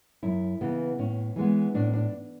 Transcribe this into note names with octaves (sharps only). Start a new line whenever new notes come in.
F#2 E4
C#3 E3 B3
A2 C#4
E3 G#3 B3
A2 D4
D4